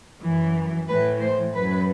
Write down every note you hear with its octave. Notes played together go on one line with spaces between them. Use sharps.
F#2 E3
A2 E3 B4
C5
F#2 F#3 B4